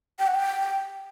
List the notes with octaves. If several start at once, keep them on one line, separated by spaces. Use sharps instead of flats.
G5
F#5
G5